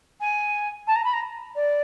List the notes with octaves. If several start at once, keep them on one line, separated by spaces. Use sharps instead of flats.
G#5
A5
A#5
B5
A#5
D5